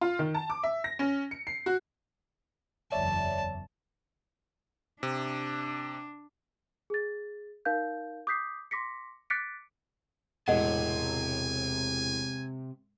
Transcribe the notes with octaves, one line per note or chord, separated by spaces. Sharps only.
F4
D#3
A5
D6
E5
A#6
C#4
C#7
C7
F#4
F#1 E2 F#3 C#5 D5 E5 A5
C3 D4
G#4 A6
D#4 A#4 F5 G6
D6 D#6 G6 B6 C7
C6 D6 A#6 B6 C#7
D6 F#6 A6 B6 C#7 D7
E1 A2 C3 D#5 F#5 G#5